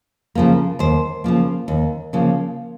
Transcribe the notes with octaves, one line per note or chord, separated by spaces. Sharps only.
C#3 F3 A#3
D#2 C5
C#3 F3 A#3
D#2
C#3 F3 A#3